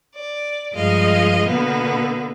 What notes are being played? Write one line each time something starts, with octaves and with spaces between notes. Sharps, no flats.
D5
G2 F3 G#3 D#5 F5
B2 D3 A#3 B3